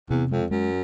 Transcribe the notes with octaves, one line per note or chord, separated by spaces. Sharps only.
E2 C3
F2 G#3
F#2 G#3